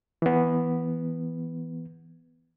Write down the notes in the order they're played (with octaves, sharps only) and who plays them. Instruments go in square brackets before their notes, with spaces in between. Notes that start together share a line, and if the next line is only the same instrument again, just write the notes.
[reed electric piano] E3 B3